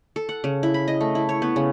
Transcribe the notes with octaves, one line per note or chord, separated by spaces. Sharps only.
A4
F#5
C#3
E4
B5
D#5
A3
E4
C#5
B3
C#3